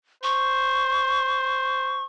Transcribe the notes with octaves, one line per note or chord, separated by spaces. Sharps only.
C5 C#6